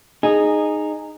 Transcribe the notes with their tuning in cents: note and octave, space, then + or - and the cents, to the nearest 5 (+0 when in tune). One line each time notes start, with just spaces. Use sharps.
D#4 -15 G#4 +0